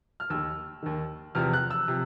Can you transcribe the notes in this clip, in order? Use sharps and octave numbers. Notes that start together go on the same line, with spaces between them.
F6
D#2 D#3 E6
D#2 D#3
E2 C3 F3 F6
F#6
E6
C3 F3